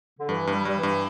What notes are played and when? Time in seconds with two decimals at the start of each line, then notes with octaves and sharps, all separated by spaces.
0.18 D3
0.29 G2 E3
0.47 G2
0.53 G3
0.65 G2 G3
0.77 E3
0.83 G2